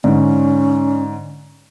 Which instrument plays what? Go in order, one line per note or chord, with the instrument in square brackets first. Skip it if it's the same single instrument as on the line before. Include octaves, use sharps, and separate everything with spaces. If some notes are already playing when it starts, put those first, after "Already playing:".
[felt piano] G#2 [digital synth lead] D3 [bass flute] C#4